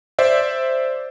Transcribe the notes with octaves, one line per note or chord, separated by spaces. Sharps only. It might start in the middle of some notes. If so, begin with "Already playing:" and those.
C5 D5 E5